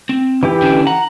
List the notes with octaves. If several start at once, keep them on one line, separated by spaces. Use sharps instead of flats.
C4
E3 E4 G4
D3 C#4 D4
F#5 A#5